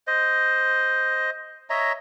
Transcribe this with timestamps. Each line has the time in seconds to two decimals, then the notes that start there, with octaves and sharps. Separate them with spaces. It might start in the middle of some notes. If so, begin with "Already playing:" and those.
0.07 C5 D#5
1.70 C#5 D#5 E5 A#5